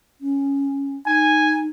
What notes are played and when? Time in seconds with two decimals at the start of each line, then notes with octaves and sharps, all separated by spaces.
0.21 C#4
1.06 D#4 G#5